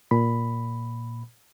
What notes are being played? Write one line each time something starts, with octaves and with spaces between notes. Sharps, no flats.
A#2 B5